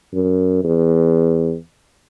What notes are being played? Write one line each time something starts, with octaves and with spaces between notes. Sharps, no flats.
F#2
E2